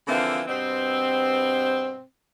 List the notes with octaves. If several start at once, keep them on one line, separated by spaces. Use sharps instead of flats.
D3 E3 F3 A#3 C4
G2 B2 C4